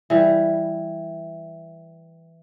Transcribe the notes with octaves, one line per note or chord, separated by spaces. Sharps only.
E3 G3